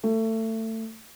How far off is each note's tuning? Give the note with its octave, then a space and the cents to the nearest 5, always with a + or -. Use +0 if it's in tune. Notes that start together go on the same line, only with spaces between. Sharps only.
A3 +25